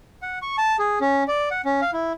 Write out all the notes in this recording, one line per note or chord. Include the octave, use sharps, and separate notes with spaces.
F#5
C#6
A5
G#4
C#4
D5
F#5
C#4
F5
E4